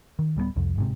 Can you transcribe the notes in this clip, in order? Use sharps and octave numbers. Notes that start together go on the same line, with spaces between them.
D#3
D1 G3 G#3 B3
C2 F2
G1 G#2 C3